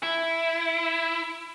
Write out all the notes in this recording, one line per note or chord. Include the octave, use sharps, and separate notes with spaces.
E4